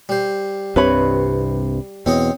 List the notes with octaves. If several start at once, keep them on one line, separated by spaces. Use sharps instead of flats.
G3 C5
C2 G2 C3 B4 C#5 B5
E2 B2 C4 C#5 D#5